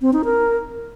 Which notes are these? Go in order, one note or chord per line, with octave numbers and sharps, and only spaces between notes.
C4
D#4
A#4